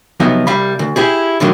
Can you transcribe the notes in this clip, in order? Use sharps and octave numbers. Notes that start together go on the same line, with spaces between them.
C3 F3 F#3 B3 D#4
C2 G3 F5 B5
D2
E4 G4 G#4
A2 D3 D#3 F#3